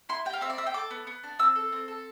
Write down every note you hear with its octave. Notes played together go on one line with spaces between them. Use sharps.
E4 C6
G4 G5
F5
C4 E5
D5
C4 E5
G5
A4 D6
B3
B3
D4
C4 E6
A4
C4
A4